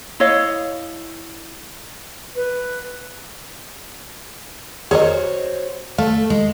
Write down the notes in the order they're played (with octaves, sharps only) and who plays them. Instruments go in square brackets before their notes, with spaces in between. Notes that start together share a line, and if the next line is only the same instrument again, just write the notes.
[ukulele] E4 C#5 D#5 F5
[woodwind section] B4
[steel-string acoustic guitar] F#4 C5 C#5 [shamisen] G#4 A#4 D#5
[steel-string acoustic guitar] A3 [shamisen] F5
[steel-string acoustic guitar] G#3